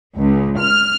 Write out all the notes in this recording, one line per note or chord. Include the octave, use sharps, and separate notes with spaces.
C#2
F6